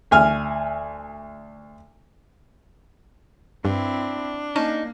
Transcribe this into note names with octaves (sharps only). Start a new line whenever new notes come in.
D2 G#5 F6
G2 C4 D4 E4
A#3 C#4 D#4 A5 D#7